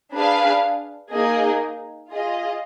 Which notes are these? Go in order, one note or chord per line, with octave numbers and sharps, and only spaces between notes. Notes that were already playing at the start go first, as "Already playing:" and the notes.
D4 G#4 B4 F5
A#3 D#4 G#4 D#5
F4 G#4 D#5